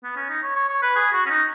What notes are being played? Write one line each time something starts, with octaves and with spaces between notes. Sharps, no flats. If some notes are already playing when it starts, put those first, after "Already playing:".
B3
C#4
D#4
C#5
C#5
C#5
B4
G#4
F#4
C#4
D#4